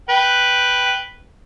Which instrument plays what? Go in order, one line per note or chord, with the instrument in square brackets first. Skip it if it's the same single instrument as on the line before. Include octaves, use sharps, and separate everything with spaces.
[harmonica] B4 G5